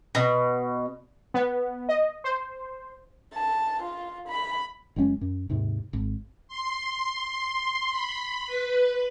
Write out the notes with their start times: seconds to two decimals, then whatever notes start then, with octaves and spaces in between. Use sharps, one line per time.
0.15 B2
1.34 B3
1.89 D#5
2.24 C5
3.34 A5
3.83 F4
4.29 B5
4.96 F#1 G#3 C4 C#4
5.21 F#2
5.50 D#2 G#2 C3
5.93 G#1
6.48 C6
7.89 B5
8.47 B4